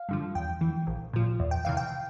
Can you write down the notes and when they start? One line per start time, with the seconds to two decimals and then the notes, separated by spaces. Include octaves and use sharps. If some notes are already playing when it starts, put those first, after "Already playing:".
Already playing: F5
0.09 G2 D3 F3
0.35 E2 G5
0.61 E3
0.87 A#1
1.13 A#2 F3
1.40 E2
1.51 G5
1.65 C3 E3 F5
1.77 G5